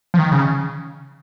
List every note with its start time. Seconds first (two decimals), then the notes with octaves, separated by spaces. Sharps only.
0.14 F3
0.18 D#3
0.32 C#3